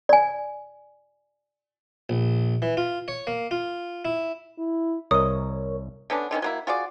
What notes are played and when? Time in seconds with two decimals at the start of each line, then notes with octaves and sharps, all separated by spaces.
0.09 D5 G#5
2.09 A#1
2.62 E3
2.77 F4
3.08 C#5
3.27 A#3
3.51 F4
4.05 E4
4.58 E4
5.11 C2 A#4 C#5 D#5 D#6
6.10 D3 B3 C#4 D4
6.31 D3 D#3 C4 C#4
6.42 F#3 A#3 E4
6.67 F4 F#4 G#4 D5